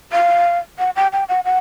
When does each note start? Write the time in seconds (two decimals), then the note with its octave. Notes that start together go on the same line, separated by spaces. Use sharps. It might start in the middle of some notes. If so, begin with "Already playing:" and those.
0.12 F5
0.79 F#5
0.96 G5
1.12 G5
1.29 F#5
1.45 F#5